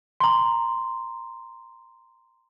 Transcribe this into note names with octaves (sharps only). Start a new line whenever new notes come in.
A#5 C6